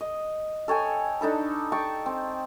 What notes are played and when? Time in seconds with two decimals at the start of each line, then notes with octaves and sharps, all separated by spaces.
0.01 D#5
0.68 A4 C#5 G5 G#5
1.21 D4 D#4 A4 B5
1.72 G5 A5 C#6
2.06 C4